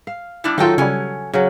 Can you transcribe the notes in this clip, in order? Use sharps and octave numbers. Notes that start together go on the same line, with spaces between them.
F5
G3 D4 E4
D#3 F#3 A3 D#4 F4 F#4 A4 G5
C#3 G3 C#4 G#5
C#3 F#3 C#4